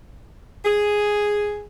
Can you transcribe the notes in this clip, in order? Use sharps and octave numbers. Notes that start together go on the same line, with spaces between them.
G#4